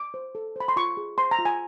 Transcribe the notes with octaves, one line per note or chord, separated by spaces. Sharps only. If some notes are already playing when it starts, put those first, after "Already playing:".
Already playing: D6
C5
A4
C5 B5
C6
F4 C#6
G#4
C5 C6
A#5
F4
G#5